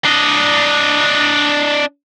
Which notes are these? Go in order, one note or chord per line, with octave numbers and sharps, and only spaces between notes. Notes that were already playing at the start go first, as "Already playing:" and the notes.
D4 D#5